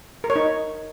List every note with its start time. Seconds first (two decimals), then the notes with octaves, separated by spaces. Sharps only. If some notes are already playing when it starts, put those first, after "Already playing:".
0.24 A#4
0.30 C#5
0.36 D#4